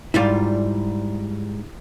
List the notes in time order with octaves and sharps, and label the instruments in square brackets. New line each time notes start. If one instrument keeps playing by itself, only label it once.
[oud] G#2 G3 F4 [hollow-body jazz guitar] E4 D5